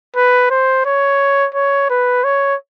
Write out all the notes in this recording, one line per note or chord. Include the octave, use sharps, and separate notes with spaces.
B4
C5
C#5
C#5
B4
C#5